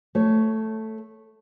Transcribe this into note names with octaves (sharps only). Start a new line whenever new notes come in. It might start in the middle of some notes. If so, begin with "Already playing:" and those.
A3 C#5